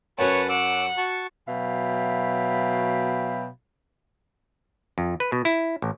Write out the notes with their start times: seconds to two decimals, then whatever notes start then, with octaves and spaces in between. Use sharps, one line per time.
0.19 F#2 C#4 B4 C#5 F#5 A5
0.49 F#5 D6 E6
0.98 F#4 A5 C#6
1.48 B2 F#3 E5 F5 G5 B5
4.98 F2
5.20 B4
5.32 B2
5.45 E4
5.82 A1